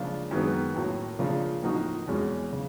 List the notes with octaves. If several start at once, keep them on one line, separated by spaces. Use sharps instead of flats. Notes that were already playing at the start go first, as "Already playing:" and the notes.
Already playing: C#3 F3 A#3 D4 F4
F#2 D#3 G#3 B3
A2 F#3 A#3
C#3 F3 A#3 D4 F4
A2 F3 A#3 D#4 F#4
E2 B2 G#3 C#4
C#3